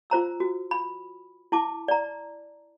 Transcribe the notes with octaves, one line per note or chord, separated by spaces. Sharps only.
F4 C5 A#5 E6
F#4
B5
E4 A5 D6
D5 A#5